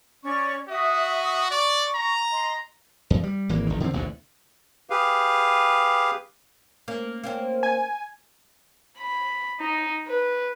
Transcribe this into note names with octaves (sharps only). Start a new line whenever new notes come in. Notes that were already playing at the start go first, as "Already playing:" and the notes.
C#4 D5 C#6
F#4 E5 D#6
D5 C#6
A#5
D#5 C6
E2
G3
G#1 E3 A#3
G#1 D#3
D3 D#3 A#3 C4
A1 D2 B2 D3
G4 G#4 B4 F5
A#3 C#4
A#3 C4 C#4
G#5
B5
D#4
B4